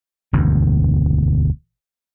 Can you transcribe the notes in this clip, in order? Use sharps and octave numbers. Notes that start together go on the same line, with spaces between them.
E1 D2 G2